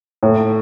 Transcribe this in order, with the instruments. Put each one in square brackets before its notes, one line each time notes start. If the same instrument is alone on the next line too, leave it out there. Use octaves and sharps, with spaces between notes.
[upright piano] A2